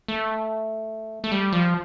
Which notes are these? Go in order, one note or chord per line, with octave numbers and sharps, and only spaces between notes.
A3
A3
G3
F3